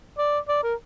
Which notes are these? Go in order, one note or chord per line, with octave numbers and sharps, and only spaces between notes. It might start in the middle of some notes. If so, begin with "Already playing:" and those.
D5
D5
A#4